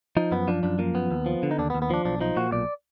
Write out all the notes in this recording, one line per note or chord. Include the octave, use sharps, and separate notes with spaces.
F3 D#4
F#2 B3
F3 D4
F#2 D4
F3 A#3
F#2 B3
D#2
F3
D3
D#4
D#2 D4
B3
D#2
B3
F3 D4
B1 D4
F3 D#4
A#2 F#4
B1 D5